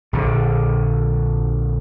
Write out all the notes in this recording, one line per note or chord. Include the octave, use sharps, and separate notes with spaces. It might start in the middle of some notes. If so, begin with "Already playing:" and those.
A#1 D3